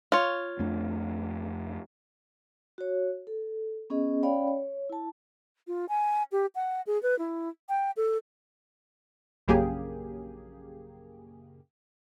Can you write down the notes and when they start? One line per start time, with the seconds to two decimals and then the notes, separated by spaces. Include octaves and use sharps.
0.12 F4 C#5
0.59 F2 A3 D4
2.78 F#4 C#5
3.27 A4
3.90 B3 C#4 G#4 D#5
4.23 C#4 C#5 D5 F5 G5 B5
4.48 C#5
4.89 E4 A5
5.67 F4
5.89 G#5
6.32 G4
6.55 F#5
6.87 G#4
7.03 B4
7.19 E4
7.69 G5
7.97 A4
9.48 A#1 F#2 C#3 A#3 G4 G#4